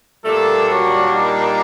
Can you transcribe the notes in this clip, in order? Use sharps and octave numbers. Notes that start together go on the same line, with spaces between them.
A#2 G3 A3 A#3 D4 A4
F#3 F#4
D#4